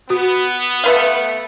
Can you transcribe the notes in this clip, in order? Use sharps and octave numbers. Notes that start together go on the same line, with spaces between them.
B3 F#4
A3 B4 F5